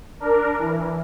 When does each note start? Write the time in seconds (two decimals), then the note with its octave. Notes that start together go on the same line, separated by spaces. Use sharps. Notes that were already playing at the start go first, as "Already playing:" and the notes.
0.20 D4 A#4
0.59 E3